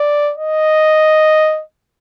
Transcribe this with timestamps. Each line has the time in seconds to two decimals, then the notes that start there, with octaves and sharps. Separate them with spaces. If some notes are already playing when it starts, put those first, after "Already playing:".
Already playing: D5
0.38 D#5